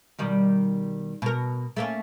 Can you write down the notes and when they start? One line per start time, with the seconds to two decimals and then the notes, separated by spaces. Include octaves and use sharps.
0.19 B2 D#3 G3
1.22 B2 A#4
1.77 A3 A#3 C#4